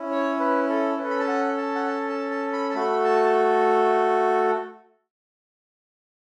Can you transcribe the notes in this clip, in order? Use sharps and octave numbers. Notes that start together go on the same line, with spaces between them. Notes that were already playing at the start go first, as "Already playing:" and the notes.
Already playing: C#4 E4
C#5
B4
A4
C#4 A4 B4
B5
A5
F#5
A5
F#5
A5
A5
A5
B5
A5
A3 F#4 A4 B5
A5